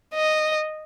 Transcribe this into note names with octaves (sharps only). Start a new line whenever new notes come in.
D#5